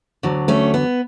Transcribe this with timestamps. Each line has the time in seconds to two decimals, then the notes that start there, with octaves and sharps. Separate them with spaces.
0.23 D2 D3 F#3
0.48 A3 C#4
0.74 B3